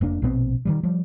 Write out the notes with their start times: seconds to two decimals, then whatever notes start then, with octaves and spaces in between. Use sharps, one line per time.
0.01 F1 A#3 D4
0.22 A#1 B2 B3 C4
0.65 D#3 F#3 G3
0.83 F3 G3